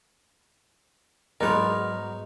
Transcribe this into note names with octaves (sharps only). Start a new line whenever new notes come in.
G#2 F#3 B3 D#4 A#4 C#5 D5